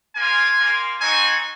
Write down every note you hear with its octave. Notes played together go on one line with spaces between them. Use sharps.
A#3 F4 G#5
A#3 F4
C4 D#4 F#4 G#5